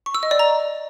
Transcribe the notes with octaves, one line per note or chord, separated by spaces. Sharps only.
C#6
E6
D#5
D5
A#5